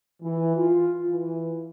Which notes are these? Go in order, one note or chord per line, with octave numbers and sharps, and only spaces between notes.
E3
F4
E3